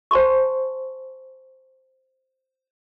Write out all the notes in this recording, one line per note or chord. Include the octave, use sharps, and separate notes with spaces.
C5 G#5 A5 C6 C#6